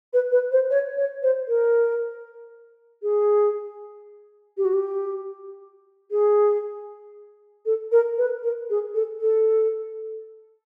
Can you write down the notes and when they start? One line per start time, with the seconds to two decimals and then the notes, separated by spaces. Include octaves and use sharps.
0.13 B4
0.31 B4
0.51 C5
0.70 C#5
0.97 C#5
1.22 C5
1.48 A#4
3.02 G#4
4.57 G4
4.64 F#4
4.73 G4
6.11 G#4
7.65 A4
7.91 A#4
8.17 B4
8.43 A#4
8.70 G#4
8.94 A4
9.20 A4